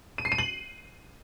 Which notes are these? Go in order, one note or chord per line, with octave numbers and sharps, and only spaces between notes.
D#7
C7
D#7
F#7